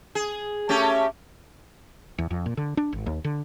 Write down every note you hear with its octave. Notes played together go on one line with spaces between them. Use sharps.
G#4
A3 C#4 G4
E2
F2
A#2
D3
D4
G#1
D#2
D3